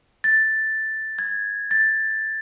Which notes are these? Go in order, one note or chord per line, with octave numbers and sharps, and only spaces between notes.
A6
G#6
A6